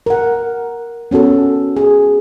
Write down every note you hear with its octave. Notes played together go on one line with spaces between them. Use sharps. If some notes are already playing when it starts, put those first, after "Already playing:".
A#4 F#5
B3 C#4 F#4 A4
G#4